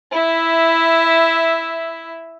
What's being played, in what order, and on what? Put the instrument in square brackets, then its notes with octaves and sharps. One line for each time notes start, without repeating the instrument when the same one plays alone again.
[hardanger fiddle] E4 E5